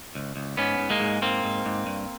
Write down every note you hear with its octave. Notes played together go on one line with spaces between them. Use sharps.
C#2
C#2
G#2 B3 C#4
G#2
G#3 A#3
G#2
G#2 A#3 C4
G#2
G#2
G2